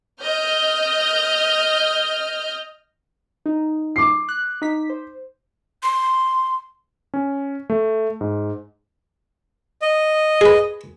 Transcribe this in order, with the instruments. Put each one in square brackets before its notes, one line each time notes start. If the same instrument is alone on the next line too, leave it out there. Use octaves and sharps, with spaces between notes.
[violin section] D#5 F6 G6
[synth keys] D#4
[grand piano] D6 C7
[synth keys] F#6
D#4 B6
C5
[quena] C6
[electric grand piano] C#4
A3
G#2
[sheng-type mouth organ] D#5
[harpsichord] G#4 B4